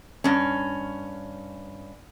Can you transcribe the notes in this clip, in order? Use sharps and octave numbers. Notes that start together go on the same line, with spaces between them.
G2 C#4